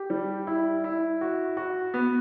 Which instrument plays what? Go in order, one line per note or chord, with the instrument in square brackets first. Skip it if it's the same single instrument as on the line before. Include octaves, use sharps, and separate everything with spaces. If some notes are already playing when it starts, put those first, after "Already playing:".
Already playing: [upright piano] G4
G3
E4
E4
F#4
F#4
B3